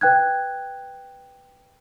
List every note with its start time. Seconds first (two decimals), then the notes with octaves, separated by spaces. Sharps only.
0.01 B4 G5 F#6 G#6